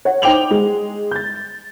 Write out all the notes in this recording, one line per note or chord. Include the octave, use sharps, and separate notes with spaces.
C#5 F#5
D#4 C5 G5 D6 F7 F#7
G#3
G6 A6